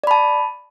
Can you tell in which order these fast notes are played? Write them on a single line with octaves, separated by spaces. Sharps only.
D5 B5 A5